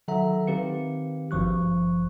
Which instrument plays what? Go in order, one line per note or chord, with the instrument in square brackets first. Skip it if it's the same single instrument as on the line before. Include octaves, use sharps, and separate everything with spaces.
[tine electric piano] D#3 F#3 A4 E5 F#5 A#5
D#3 C4 G4 B4 F5 C#7
G#1 G2 F3 C#6 F#6